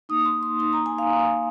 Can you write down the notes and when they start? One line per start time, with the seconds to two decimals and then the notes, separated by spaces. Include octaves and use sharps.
0.09 A#3 D#4 D#6
0.25 C6
0.43 C6
0.59 A#3 D#4 C6
0.73 A#5
0.86 G#5
0.98 F5
1.11 A#3 D#4